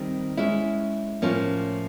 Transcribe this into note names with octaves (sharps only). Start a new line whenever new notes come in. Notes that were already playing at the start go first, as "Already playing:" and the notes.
Already playing: D#3 G3 C4
G#3 C#4 E4
A2 F3 A#3 C#4